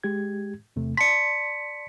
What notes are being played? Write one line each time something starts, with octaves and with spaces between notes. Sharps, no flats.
G#3 G4 G#6
E2 C3 A3
D5 A5 C6 B6 C#7